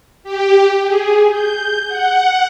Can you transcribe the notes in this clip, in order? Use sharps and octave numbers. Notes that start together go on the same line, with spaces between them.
G4
G#4
G6
F#5